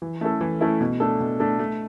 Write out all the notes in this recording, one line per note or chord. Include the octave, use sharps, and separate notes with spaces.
E3
A3 C#4 E4 A4
E3
A3 C#4 E4 A4
B2
A3 D4 A4
B2
A3 D4 A4
A3